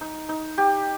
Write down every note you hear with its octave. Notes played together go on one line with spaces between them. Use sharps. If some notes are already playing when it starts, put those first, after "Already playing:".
D#4
D#4
G4